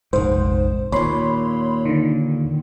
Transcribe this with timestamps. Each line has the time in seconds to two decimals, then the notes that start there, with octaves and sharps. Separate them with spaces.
0.13 F1 A#1 G#2 C5
0.92 D#2 A#2 C#5 B5 C6
1.85 D3 D#3